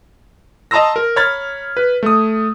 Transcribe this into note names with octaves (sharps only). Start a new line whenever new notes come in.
D#5 A5 A#5 C6 E6 A#6
A#4
C#5 A#5 B5 F6 G#6 A6
B4
A3 D#6